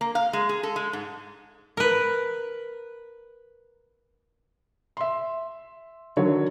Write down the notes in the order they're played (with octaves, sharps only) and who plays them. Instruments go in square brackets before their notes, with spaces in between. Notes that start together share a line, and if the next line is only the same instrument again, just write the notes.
[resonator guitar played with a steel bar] A#3
F5
G#3
G#4
A4
G#3
G#2
[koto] A#4 B4
[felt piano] E5 C6
D3 D#3 F#3 C#5